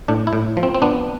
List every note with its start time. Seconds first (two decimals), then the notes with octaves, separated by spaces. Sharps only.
0.08 A2 D4
0.27 E4
0.33 A2
0.57 F3
0.63 C4
0.75 C4
0.82 B3 D4